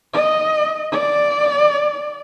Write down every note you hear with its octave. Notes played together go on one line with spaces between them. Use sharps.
D#5
D5